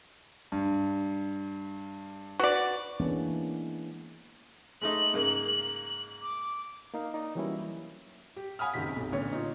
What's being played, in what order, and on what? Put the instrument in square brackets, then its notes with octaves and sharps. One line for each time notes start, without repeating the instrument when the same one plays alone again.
[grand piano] G2
[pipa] F#4 D5 [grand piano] B4
[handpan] E3 G#3 A#3 B3 C#4 D4
[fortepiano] G#3 A3 D#4 [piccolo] F#7
[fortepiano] G#2 C#3 A#3
[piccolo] D6
[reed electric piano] A#3 D#4 F5
D#4 D5 A#5
E3 F#3 G3 A#3 C#4 E4
[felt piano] G4
F5 F#5 G#5 B5 D#6 F6
F#1 C3 D#3 C4 B6
B1 C3
A1 A#2 D3 B3 C#5
D#4 F4